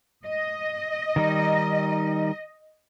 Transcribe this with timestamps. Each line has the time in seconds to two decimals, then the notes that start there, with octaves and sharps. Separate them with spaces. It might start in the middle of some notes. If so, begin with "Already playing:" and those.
0.24 D#5
1.16 D#3 G3 D#4